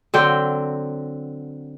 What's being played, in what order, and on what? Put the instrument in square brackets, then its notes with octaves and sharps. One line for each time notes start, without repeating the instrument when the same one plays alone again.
[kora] D3 F#3 C4 G5